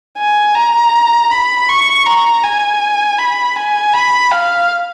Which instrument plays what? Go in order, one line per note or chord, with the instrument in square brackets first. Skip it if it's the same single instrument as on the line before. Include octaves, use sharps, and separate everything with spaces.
[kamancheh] G#5
A#5
B5
C#6
A#5
G#5
B5
G#5
B5
F5